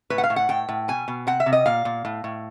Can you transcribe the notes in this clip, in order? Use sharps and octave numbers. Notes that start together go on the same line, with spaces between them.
A2 B4
F#5
F5
A2
F#5
A2 G5
A2
B2 G#5
B2
C3 F#5
E5
C3
D#5
A#2 F5
A#2
A2
A2